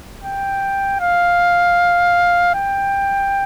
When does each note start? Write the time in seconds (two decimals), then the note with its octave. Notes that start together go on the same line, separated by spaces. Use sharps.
0.24 G5
1.01 F5
2.55 G5